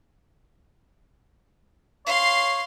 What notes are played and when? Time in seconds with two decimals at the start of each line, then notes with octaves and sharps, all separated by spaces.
2.06 C#5 F5 C6